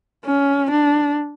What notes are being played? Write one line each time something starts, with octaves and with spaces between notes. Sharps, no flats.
C#4
D4